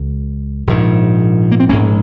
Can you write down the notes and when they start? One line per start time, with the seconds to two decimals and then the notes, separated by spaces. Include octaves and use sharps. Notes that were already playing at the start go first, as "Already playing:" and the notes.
Already playing: C#2
0.67 A#1 G#2
1.52 A#3
1.60 C4
1.69 A#1 A#3 C#4
1.73 G#2